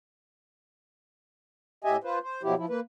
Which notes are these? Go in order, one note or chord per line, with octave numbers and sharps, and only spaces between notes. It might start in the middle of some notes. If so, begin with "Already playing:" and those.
A2 G4 D#5 E5 G#5
F4 B4 C5
C5
B2 F3 F#3 E4 G4
F3 E4
A#3 B4